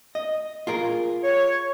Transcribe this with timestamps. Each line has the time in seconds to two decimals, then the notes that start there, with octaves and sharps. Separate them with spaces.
0.15 D#5
0.67 F4 G#4 A#4
1.24 C#5